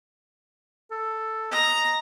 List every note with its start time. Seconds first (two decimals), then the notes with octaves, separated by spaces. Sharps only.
0.91 A4
1.52 D#5 A#5